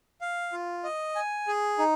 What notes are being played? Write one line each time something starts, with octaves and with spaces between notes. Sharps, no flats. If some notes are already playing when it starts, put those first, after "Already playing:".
F5
F4
D#5
G#5
G#4
D#4